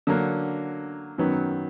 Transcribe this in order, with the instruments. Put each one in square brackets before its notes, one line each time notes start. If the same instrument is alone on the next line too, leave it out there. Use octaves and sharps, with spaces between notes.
[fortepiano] D3 F#3 A#3
F#2 D#3 F#3 B3